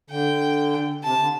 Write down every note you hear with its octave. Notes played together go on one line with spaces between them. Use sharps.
D3 G5
C3 A5
D3